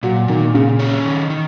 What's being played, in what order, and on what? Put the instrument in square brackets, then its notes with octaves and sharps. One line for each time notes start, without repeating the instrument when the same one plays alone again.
[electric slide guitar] A#2 [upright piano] F#3
[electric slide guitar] A#2 [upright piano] D#3
[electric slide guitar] A#2 [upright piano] C#3
[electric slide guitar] C#4
D#3
D#3